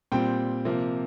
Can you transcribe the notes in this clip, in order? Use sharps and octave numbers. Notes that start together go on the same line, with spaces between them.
A#2 G3 C4 G5
C3 F3 A#3